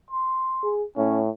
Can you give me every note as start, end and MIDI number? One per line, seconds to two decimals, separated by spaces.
0.11 0.71 84
0.63 0.84 68
0.97 1.30 45
0.97 1.21 61